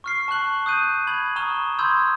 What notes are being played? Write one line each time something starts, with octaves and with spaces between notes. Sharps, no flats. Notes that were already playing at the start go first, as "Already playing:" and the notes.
C#6 F6 C7
A5 C#6 F6 F#6 F#7
D#6 F#6 G6 D#7
B5 G#6 F#7
A#5 C#6 D#6 F6 E7 G7
B5 C6 D#6 E6 G6 G#6